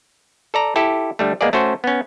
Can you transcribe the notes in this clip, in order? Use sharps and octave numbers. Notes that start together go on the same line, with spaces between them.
A4 D5 A#5
E4 G4 A4
D3 G3 A3
G#3 A#3 B3 G#4 D5
A3 C#4 F#4 C5
B3 C#4